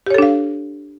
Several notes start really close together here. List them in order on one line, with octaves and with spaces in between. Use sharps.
G4 C#5 A4 D4 F5